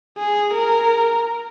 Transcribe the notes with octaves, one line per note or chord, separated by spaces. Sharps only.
G#4
A#4